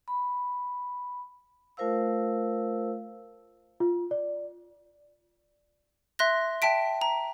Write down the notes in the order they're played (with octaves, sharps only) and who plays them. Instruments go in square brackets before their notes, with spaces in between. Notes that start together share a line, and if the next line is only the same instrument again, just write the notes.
[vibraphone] B5
A3 F4 A#4 C5 F5 E6
[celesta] F4
D5
[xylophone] E5 C6 F#6 A#6
E5 G5 A5 B6 D7
A#5